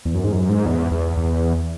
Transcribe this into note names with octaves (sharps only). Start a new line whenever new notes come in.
E2
F#2
G#2
F#2
G#2
E2
E2
E2